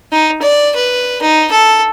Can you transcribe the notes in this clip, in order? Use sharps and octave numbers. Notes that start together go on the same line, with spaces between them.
D#4
D5
B4
D#4
A4